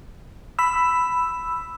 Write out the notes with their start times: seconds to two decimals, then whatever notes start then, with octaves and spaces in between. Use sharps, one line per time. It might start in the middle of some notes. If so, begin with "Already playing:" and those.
0.59 B5 E6